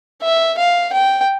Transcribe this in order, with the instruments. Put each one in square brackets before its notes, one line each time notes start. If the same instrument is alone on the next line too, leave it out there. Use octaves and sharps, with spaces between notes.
[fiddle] E5
F5
G5